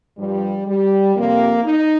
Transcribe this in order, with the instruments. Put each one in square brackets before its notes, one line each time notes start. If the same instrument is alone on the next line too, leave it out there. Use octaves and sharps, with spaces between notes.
[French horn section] G2 F3 G3
G3
F2 C3 F3 A#3
D#4